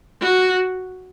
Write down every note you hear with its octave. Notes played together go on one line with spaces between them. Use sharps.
F#4